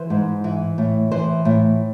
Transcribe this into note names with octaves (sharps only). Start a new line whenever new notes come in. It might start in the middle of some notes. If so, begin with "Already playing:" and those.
Already playing: E3 C5
G#2
E3
A2
E3 C5
A2